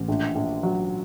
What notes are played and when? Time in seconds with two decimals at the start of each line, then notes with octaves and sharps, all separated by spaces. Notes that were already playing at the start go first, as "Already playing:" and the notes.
Already playing: A1
0.08 A#1
0.35 A#1
0.63 F#3